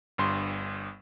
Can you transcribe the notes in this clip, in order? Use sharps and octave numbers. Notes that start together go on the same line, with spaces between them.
G1 G2 C6